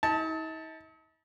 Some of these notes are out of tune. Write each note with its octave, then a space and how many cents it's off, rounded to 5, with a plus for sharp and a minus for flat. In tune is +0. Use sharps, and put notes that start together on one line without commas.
D#4 +45 A5 +0